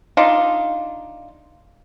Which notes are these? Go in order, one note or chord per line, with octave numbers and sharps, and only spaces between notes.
D4 D#4 F4